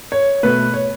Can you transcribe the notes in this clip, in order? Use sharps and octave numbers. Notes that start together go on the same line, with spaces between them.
C#5
B2 A3 B4
C#5